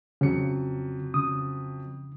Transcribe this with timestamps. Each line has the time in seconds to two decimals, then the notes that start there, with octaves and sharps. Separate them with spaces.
0.21 F2 C#3 F#3 C#7
1.14 C#3 D#6